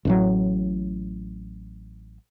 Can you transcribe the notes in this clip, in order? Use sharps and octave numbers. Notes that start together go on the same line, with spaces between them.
A1 A2 F#3